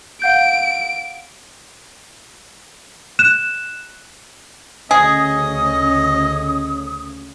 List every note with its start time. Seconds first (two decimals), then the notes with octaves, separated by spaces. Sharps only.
0.22 F5 F#5 G6 D7
3.19 F#6 E7
4.91 D2 C#3 C#4 G#4 D#5 D#6